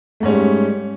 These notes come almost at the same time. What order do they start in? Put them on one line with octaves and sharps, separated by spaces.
A3 G#2 C#4 G3